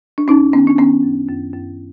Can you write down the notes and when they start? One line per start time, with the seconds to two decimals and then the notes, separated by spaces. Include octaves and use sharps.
0.18 D4
0.28 F#2 C#4 D#4
0.53 D#3 B3 C#4
0.67 D4
0.78 D#3 B3 C#4
1.03 F#2
1.28 F#2
1.54 F#2